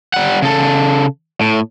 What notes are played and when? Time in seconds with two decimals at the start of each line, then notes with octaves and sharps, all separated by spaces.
0.14 G3 F#5
0.42 C#3 A4
1.41 A2